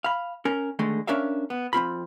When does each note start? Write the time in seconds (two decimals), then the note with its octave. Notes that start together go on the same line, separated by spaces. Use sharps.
0.04 F5 B5
0.45 C#4 A#4
0.79 D3 D#3 G#3 A3
1.07 C#4 D4 A#4 E5 F5
1.50 B3
1.73 F2 C4 F4 B5